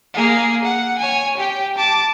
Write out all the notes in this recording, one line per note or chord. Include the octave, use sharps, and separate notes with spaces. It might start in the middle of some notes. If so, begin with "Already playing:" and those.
A#3 G#4
F#5
C#5 G#5
G4 G5
A5 D6